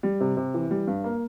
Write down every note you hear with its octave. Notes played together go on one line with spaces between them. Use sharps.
G3
C3
C3
E3
G3
G2
A#3